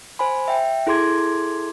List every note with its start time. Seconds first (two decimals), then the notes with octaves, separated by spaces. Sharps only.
0.19 C5 G#5 B5
0.48 E5 G5
0.87 E4 G#4 A4 C6 D6 G#6